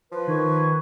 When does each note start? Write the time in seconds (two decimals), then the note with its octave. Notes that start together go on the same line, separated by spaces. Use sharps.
0.12 F3 B4
0.27 D#3 D#5 C#6 G#6